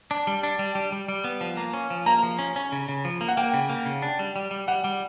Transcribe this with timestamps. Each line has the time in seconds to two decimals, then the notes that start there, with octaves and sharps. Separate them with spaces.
0.11 D4
0.27 G3
0.43 D4
0.59 G3
0.75 G3
0.92 G3
1.08 G3
1.24 B3
1.41 F3
1.57 A#3
1.73 C#4
1.90 F3
2.06 A#3 A#5
2.23 F3
2.39 C#4
2.56 C#4
2.72 C#3
2.89 C#3
3.05 F3
3.21 A#3
3.28 F#5
3.37 A#3 G5
3.54 C#3
3.69 A#3
3.86 C#3
4.02 D4
4.19 G3
4.36 G3
4.51 G3
4.68 G3 F#5
4.84 G3